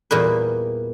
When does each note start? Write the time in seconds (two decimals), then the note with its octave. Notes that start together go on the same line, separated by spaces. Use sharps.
0.11 E2 A#2 G3 A#3 G#4 B4